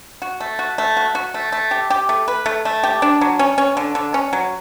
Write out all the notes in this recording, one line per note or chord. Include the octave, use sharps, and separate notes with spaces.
F#4
A3
F#4
A3
F#4
F#4
A3
A3
G4
G4
A3
B4
A3
A3
G4
D4
F#3
C#4
C#4
D3
D3
C#4
F#3